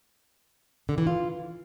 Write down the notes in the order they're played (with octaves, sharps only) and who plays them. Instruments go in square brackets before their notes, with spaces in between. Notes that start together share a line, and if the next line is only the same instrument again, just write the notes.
[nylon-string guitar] D3
E3
F4